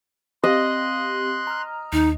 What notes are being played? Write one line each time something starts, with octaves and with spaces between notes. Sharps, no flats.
C4 G4 D#5 F5 C6 F#6
A#5 F6
D#2 D#4